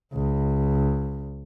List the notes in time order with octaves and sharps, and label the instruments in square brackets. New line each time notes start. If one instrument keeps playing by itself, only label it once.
[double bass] C#2